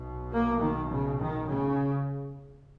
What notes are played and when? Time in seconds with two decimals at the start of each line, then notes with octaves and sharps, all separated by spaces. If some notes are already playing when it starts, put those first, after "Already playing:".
Already playing: B1 B2
0.31 A#3
0.60 D#3
0.90 C#3
1.20 D#3
1.49 C#3